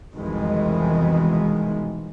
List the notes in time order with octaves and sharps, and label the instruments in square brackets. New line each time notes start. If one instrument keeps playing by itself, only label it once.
[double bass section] C2 F2 B2 D#3 E3 G#3